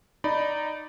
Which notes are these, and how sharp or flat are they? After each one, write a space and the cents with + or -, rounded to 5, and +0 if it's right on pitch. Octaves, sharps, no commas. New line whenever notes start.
D#4 -15 D5 -5 B5 +0